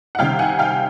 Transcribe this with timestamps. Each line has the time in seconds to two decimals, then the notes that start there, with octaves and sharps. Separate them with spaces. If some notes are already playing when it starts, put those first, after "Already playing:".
0.15 F#5
0.19 C2 C3 D#3 F5 G5
0.39 F#5 G#5
0.59 F5 G5